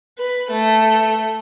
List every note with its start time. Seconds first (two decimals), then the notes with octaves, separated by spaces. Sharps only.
0.18 B4
0.51 A3